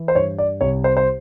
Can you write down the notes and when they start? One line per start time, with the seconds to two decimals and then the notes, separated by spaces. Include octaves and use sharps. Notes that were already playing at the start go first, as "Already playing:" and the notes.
Already playing: E3
0.08 C5
0.15 G2 C#5
0.38 D5
0.61 C2 C#5
0.84 C5
0.97 C5